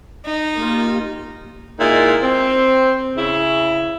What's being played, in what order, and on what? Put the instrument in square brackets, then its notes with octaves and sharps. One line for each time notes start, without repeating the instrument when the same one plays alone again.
[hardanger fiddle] D#4
[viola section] A#3 F4 G4
[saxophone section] A#2 G#3 D#4 E4
C4
C#3 E4